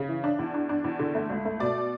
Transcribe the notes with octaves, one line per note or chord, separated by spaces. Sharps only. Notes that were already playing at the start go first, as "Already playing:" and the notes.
Already playing: C#3
E3
D4
E2
D4
D4
E2
D3
A3
C#2
A3
B2 D5